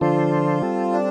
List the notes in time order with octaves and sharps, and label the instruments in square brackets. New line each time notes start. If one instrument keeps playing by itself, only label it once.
[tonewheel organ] D3 F3 D4 A4 C5 [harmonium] F4
[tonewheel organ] G3 C4 A4
[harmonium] D4